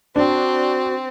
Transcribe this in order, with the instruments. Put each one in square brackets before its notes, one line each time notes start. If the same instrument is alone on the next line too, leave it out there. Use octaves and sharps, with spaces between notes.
[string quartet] C4 [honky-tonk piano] D4 [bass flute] F#4